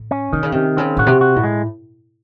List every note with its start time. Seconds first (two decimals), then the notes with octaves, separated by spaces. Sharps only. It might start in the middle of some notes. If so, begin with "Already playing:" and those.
Already playing: A2
0.11 C#4
0.33 C3 D#3
0.43 C#3
0.52 C3 D#3
0.77 C#3 C4
0.97 A2 F#4
1.07 C3
1.21 F#4
1.36 A2
1.44 G#3